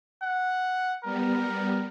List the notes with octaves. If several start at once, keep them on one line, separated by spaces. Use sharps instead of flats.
F#5
G3 B3 A#4